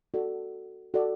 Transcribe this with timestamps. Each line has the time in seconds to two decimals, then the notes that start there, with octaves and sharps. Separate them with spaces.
0.14 F#4 A4 D5
0.94 F#4 A4 D5